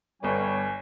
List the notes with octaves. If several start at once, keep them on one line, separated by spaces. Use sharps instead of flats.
G1 G3 B3 C#5 G#5